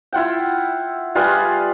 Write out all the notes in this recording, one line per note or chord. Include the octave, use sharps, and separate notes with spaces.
E4 F4 F#5 G5
G3 F4 G#4 B4